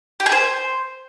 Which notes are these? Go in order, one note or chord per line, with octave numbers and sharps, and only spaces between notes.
G4
G#4
C5